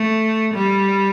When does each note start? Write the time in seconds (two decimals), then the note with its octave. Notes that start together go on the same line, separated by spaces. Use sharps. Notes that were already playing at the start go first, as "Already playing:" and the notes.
Already playing: A3
0.55 G3